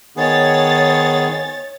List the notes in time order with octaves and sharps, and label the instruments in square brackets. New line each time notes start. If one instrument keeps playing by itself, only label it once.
[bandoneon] D#3 B3 G#4 [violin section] C#5 A6